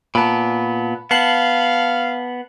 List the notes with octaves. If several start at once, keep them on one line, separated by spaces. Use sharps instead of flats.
A#2 B3 A5 B5
B3 F5 A5 C7 F#7